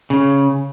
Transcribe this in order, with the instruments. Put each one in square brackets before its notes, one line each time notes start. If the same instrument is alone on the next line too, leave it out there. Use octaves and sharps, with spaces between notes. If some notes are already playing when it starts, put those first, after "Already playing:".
[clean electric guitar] C#3